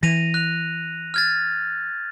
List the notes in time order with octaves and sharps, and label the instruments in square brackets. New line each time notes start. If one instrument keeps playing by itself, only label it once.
[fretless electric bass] E3 [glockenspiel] A#6 D#7 F7
[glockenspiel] F#6 F7
F6 G#6 A6